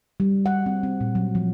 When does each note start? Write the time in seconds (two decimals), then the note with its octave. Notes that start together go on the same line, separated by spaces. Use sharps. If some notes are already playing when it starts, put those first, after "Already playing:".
0.20 G3
0.46 F#5
0.66 C4
0.83 C4
1.01 A#2
1.15 F#3
1.35 F3